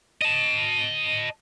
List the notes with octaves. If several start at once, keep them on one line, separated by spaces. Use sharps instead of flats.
D#5 A5